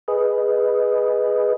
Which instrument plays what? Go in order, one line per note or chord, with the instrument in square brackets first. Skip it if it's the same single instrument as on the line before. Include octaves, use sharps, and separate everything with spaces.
[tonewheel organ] G#4 B4 D#5